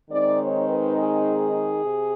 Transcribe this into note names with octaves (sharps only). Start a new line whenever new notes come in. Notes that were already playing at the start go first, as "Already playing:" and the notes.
D#3 G#3 C4 D#4 D5
C#5
B4
G#4
C3